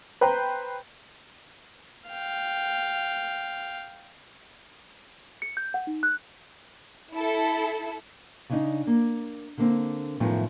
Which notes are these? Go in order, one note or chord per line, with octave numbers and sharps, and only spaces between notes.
B4 C5 G5 A#5
F5 G5
C#7
G6
F#5
D#4
F#6
E4 A4
C#3 D4 D#4
A#3
D3 A#3 C4
F#2 A2 D#3 F3 A3 B3